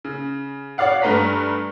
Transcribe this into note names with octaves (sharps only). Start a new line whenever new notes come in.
C#3
F#4 C#5 D5 F5 F#5
G2 A3 B4 A#5 B6